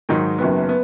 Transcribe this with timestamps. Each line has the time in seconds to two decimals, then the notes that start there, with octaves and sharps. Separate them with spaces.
0.09 G#2 D#3 F#3 D#4
0.38 F#1 F#2 D#3 B3
0.69 B3